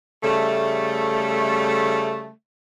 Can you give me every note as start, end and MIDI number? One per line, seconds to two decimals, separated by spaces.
0.23 2.29 49
0.23 2.29 55
0.23 2.29 57